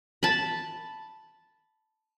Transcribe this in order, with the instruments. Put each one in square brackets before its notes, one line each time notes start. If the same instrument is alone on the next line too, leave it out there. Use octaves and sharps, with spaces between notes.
[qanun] A5 B5